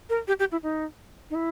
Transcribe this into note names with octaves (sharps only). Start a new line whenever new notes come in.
A#4
G4
G4
E4
D#4
D#4
E4